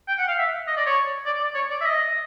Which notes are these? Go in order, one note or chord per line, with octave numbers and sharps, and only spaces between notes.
G5
F#5
F5
E5
D#5
D5
C#5
D5
D5
C#5
D5
E5
D#5